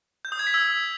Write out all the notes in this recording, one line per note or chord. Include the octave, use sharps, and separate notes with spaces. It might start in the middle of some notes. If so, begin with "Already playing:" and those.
G6
D#6
G#6
B6
E6